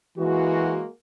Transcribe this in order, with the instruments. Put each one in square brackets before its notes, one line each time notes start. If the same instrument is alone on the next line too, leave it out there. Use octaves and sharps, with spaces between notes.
[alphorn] E3 [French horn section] G#3 A#3 F#4